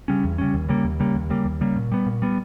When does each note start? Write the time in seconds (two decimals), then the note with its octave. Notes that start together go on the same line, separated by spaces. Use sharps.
0.08 C#3 G3 C#4
0.24 E2
0.38 C#3 G3 C#4
0.54 D#2
0.69 C#3 G3 A#3
0.85 D#2
1.00 C#3 G3 A#3
1.16 D#2
1.30 C#3 G3 A#3
1.45 D#2
1.61 C#3 G3 A#3
1.76 A#2
1.92 G3 B3
2.06 A#2
2.22 G3 B3